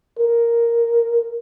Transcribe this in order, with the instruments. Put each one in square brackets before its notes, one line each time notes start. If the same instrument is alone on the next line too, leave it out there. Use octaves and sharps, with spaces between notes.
[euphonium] A#4